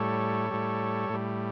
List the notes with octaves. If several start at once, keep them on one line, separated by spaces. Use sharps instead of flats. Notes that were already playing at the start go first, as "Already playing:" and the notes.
Already playing: A2 G3 A4 C#5
A2 G3
A2 G3